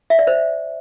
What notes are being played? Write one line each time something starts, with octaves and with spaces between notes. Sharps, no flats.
E5
D5
C5